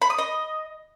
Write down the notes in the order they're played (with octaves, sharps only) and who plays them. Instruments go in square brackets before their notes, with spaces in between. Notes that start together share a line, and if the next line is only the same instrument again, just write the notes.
[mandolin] B5
D#6
D#5